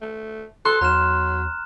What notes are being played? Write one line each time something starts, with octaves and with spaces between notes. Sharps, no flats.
A3
A4 C6 F#6
E2 F#3 A#5 F6 E7